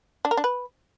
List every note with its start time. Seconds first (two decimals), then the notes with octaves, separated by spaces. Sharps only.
0.25 D4
0.31 A#4
0.37 D4
0.44 B4